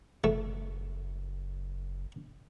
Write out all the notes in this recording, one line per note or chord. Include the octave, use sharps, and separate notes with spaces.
F#1 A3